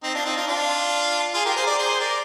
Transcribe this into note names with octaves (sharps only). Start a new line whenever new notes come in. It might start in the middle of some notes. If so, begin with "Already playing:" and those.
C4 D#4
D4 F4
C4 D#4
D4 F4
D4 F4
F4 G#4
G4 A#4
G#4 C5
A#4 D5
G#4 C5
A#4 D5